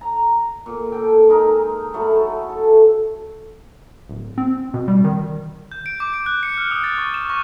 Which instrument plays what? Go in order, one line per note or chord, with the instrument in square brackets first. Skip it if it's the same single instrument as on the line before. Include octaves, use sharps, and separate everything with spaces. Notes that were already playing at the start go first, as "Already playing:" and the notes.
[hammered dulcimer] A#5
A#2
A4 G5
G#3 D#4 A#4
F#3 A3 E4
A4
[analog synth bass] D1
C4
B2
G3
D#3
[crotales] G6
D7
D6
D7
F#6
C#7
F6
D#6
A6
C#6
E7
C#6